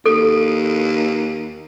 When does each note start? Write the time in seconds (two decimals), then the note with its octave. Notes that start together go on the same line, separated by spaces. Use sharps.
0.06 D#2 A4